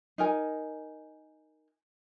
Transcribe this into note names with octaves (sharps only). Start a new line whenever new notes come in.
D#4 A#4 G#5